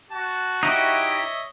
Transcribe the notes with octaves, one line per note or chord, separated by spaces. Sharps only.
F#4 A5
D#4 E4 G4 C#5 D#5 E5